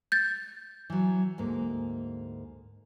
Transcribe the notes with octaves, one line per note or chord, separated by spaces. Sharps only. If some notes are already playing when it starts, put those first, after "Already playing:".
G6 A6
E3 F#3
D2 G#2 A#3